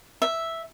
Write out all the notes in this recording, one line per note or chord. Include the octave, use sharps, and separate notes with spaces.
E5